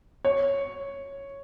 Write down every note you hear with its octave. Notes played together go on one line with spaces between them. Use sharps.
C#5